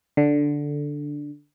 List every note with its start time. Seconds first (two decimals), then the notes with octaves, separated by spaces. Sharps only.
0.17 D3